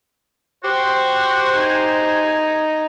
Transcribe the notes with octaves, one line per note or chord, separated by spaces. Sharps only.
F#4 G4 C5
D#4 G#5